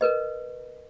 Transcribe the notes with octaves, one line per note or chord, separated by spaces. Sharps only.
A#4 B4 D#5